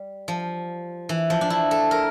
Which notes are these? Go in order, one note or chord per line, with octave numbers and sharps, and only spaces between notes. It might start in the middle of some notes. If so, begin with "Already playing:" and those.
Already playing: G3
F3
E3
F3
D4
E4
A4
A#4